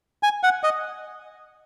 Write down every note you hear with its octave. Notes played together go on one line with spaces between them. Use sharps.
G#5
F#5
D#5